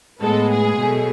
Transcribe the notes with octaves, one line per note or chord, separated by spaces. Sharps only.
A2 G#3 B3 A4
G#4
B2 F#3 A3